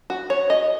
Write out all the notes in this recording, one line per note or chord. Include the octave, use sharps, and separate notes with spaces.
F#4
C#5
D#5